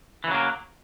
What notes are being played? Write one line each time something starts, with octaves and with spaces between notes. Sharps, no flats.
C#3 E3 F#3 A#3